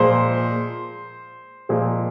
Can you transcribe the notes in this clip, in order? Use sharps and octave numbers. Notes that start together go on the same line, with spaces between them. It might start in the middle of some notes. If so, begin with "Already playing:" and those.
Already playing: A#2 F3 G#3 C5
A#2 F3 G#3